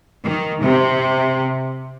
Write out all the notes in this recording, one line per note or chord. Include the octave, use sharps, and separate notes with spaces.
D#3
C3